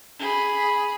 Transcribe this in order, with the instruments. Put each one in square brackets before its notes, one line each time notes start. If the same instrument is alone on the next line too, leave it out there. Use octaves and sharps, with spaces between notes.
[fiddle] G#4 B5